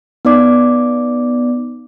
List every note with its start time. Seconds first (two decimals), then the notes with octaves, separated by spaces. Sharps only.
0.25 B3 D#4 D5 D6